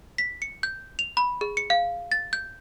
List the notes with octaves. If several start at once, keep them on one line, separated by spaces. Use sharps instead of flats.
B6
C#7
G6
F7
B5
G#4
C#7
F5
A6
G6